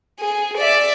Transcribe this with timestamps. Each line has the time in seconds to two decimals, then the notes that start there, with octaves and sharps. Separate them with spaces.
0.20 G#4
0.58 D5 E5